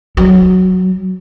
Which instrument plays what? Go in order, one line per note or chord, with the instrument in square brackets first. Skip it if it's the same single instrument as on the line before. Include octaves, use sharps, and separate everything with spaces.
[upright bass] F#3